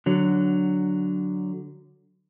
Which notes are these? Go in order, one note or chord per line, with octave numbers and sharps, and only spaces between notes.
D3 F#3